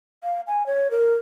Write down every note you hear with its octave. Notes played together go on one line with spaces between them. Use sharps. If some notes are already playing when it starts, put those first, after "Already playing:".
F5
G#5
C#5
A#4